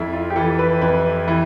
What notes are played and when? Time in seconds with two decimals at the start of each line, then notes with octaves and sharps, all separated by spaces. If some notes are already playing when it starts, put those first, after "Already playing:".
Already playing: F2 E4
0.13 F4
0.30 G4
0.36 E3 A4
0.59 B4
0.81 F2 B4
1.28 E3